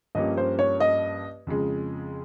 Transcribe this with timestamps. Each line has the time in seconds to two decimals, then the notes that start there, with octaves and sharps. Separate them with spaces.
0.15 G2 F3 A#3 C#4 G4 D#5
0.37 C5
0.59 C#5
0.80 D#5
1.47 F2 C#3 G#3